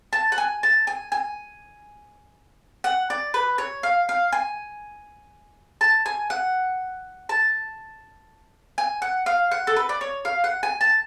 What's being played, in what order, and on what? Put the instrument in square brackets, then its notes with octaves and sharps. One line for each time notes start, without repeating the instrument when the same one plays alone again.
[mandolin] A5
F#5
G#5
A5
G#5
G#5
F#5
D5
B4
C#5
F5
F5
G#5
A5
G#5
F#5
A5
G#5
F#5
F5
F#5
A4
B4
D5
C#5
F5
F#5
G#5
A5